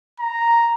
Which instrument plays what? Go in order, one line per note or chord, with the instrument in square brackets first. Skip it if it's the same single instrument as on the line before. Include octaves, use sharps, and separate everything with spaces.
[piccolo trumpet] A#5